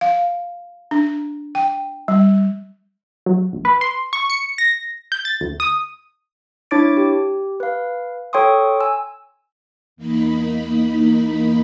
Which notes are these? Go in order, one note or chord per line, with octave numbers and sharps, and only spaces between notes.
F5
D4
G5
G3
F#3
A#1
B4
C6
C#6
C#7
A#6
G6
A6
D2
D#6
D4 E4 C#5 D6 A6 D7
G4
B4 F5
A4 C#5 G5 C6 C#6 D#6
G#5 E6
E2 A#3 D#4 B5